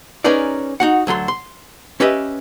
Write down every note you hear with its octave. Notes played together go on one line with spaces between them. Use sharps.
C#4 D#4 G#4 A#4 B4 D5
D#4 F#4 F#5
D2 F#3 A4 C6
C6
C#4 G4 B4 D#5 E5